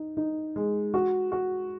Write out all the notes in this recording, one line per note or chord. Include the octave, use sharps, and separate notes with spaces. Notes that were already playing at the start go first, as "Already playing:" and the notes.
Already playing: D#4
D#4
G#3
F#4
F#4